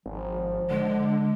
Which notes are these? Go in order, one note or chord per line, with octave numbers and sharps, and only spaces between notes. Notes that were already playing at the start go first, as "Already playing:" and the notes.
G#1 F3
D3 G#3